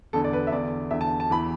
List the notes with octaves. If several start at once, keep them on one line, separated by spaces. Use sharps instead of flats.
E2 D3 A4
D5
B4
E5
E2 D3 D5
E2 D3 E5
A5
A5
E2 E3 B5